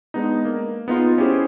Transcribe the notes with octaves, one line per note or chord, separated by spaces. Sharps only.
G#3 B3 D4 D#4
A#3
B3 D#4 F4 G#4
C#4 E4 G4 G#4 C5